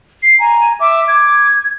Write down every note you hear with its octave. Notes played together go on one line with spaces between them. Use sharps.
C7
G#5 A#5
E5 D6
G#6